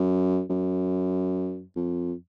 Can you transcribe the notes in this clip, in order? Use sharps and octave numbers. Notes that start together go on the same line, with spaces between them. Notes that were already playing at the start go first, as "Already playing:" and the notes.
Already playing: F#2
F#2
F2